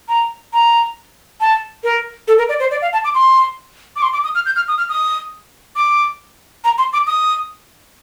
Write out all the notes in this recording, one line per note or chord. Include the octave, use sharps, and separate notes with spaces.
A#5
A#5
A5
A#4
A4
A#4
D5
C5
D5
F5
A5
D6
C6
D6
C6
D6
D#6
F6
G6
F6
D#6
F6
D#6
D6
A#5
C6
D6
D#6